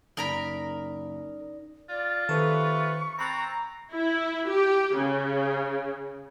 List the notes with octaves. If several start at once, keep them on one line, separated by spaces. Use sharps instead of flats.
F#1 D#4 A#4 D5 A#5 B5
F4 D5
C3 D#3 A3 A4 B4 C#6
C4 A#5 B5 F#6 A6
E4
G4
C#3